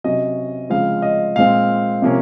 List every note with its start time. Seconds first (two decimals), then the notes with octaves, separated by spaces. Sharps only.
0.04 C3 F#3 C#4 D#5
0.70 C#3 F3 G#3 C4 F5
1.02 D#5
1.36 A#2 G#3 C4 F5
2.02 C3 F3 A#3 C#4